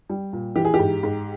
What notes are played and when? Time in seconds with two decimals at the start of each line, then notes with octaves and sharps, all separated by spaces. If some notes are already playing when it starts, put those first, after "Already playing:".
0.10 G3
0.33 A#2
0.56 E3 G4
0.65 G#4
0.74 G4
0.79 G#2
1.03 G#2